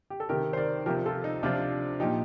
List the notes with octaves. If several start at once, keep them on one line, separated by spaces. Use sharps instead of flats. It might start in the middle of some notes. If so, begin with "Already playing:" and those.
G4
A4
C3 D#3 G4 A#4
C5
A#4 D5
C3 F3 G4 A#4
F4 A4
D#4
C3 F3 D4 F4
A#2 F3 D#4 G4